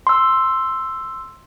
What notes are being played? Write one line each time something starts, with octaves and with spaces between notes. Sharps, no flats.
C6 E6